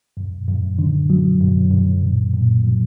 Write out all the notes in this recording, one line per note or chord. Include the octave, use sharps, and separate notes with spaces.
F#2
F#2
D3
F#3
F#2
F#2
A#2
A#2
F#3